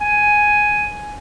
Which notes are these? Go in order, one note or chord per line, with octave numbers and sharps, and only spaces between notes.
G#5